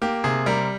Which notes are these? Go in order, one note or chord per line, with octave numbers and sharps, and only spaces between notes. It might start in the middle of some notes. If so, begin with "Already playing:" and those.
A#3 G4
C3 G#4
G3 A#4